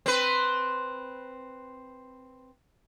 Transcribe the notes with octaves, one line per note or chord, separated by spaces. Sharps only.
C4 B4